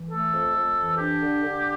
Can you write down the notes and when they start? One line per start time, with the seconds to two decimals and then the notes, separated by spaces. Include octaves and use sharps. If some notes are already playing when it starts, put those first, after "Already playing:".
Already playing: E3
0.10 A3 A4
0.32 F2
0.54 F2
0.76 E3
0.97 D4 G4
1.19 D3
1.41 D3